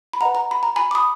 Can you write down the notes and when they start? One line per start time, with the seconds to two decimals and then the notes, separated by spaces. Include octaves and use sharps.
0.13 B5
0.21 B4 D#5 F#5 A#5
0.35 A#5
0.51 B5
0.63 A#5
0.76 G#5 B5
0.91 D6
0.95 B5 D#6